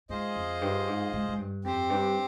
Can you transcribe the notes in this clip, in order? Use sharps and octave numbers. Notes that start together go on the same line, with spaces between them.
G#2 F4 G#4 C5 D#5
F2
G2
G#2
G#2
G#2
G2
F2 C4 G4 C5
G2